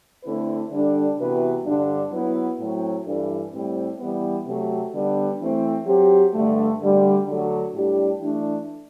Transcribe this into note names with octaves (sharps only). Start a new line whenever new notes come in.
D3 A3 C4 E4 B4
D3 G3 D4 A4
C3 E3 B3 F#4 B4
G2 D3 G3 D4
F#3 B3 E4 B4
A2 F#3 C4
G2 E3 G3 D4 A4
A2 G3 C4
E3 G3 B3
C3 F#3 A3 C4 G4
D3 G3 B3 D4
E3 A3 C4
F#3 C4 G4
G2 D3 A3
D2 D3 G3
D3 F#3 A3 D4 A4
A2 G3 D4 G4
E3 A3 D4